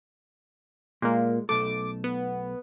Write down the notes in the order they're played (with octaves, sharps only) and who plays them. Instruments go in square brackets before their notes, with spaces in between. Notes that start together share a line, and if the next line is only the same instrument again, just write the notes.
[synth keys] A#2 A#3 [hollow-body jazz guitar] G#3
[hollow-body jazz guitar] B1 A3 A4 [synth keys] D6
[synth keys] B3